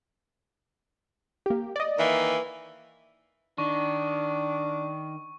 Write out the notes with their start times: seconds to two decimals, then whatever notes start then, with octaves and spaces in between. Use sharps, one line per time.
1.46 A#3 G4
1.76 D5 D#5
1.98 D#3 E3 A#3
3.58 D#3 D4 C#6